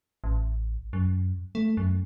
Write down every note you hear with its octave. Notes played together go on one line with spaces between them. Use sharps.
A1
F#2
A3
F#2